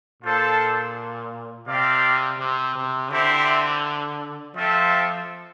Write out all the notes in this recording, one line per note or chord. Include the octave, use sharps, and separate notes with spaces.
A#2 D4 F4 A4 C5
C3 C4 G4 D5 F5
C3
C3
D3 C4 E4 G4 C5 E5
F3 A3 C4 F4 A4 E5